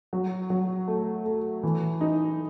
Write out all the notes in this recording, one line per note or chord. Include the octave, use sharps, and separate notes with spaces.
F#3
F#3
A3
A3
E3
D#4